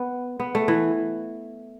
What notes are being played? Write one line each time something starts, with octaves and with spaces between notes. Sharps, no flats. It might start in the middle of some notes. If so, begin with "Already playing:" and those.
Already playing: B3
B3
A3
E3